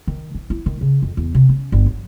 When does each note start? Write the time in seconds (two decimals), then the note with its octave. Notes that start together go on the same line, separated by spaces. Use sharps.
0.07 D#3
0.35 E3
0.50 E4
0.66 D#3
0.81 C#3
1.02 F2
1.17 E2
1.35 C3
1.49 C#4
1.72 G1
1.86 F#3